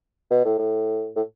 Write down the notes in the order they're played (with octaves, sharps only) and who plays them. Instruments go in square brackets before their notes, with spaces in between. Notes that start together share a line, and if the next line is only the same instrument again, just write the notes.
[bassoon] B2
A2
A2
A2